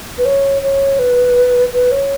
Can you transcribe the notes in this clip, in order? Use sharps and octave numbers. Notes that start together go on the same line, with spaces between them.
B4
C#5
C#5
B4
B4
C#5